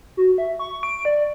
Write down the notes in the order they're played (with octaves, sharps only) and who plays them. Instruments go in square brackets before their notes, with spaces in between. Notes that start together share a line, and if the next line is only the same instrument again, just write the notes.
[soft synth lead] F#4
E5
C#6
D7
D5